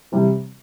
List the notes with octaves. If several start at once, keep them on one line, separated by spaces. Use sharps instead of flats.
C3 E3 G3